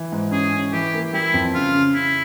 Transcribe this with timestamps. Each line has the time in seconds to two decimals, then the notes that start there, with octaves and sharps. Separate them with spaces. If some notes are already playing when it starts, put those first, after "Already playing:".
Already playing: E3
0.12 G#2
0.31 C#4 G#4
0.53 C#4
0.73 E3 G4
0.94 A#3
1.13 G3 E4
1.34 F2
1.54 C#3 F4
1.74 C#3
1.94 C#3 E4